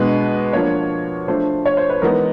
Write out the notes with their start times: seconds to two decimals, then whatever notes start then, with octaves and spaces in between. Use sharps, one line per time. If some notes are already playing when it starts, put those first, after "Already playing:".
Already playing: B2 G#3 B3 D4 B4
0.53 F3 A#3 D4 C#5
1.28 F3 A3 D4 C5
1.66 C#5
1.77 C5
1.90 B4
2.02 E3 G#3 B3 D#4 A#4